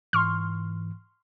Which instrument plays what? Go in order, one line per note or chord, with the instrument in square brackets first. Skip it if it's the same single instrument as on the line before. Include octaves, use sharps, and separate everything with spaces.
[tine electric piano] G#2 E3 [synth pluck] C6 C#6 F6